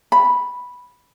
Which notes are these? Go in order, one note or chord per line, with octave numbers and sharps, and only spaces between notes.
B5